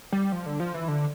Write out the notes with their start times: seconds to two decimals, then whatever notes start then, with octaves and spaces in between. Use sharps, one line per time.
0.12 G3
0.32 F3
0.46 D3
0.60 F3
0.74 E3
0.88 D3